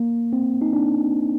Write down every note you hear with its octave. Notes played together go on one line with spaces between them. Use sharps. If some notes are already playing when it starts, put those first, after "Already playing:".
Already playing: A#3
C4
D#4
D4